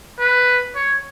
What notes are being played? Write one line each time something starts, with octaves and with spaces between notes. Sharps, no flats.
B4
C#5